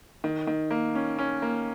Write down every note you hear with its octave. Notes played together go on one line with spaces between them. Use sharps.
D#3
D#3
A#3
C#4
C#4
A#3